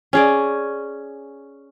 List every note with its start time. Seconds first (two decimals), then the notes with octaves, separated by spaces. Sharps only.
0.13 C#4 G#4 D5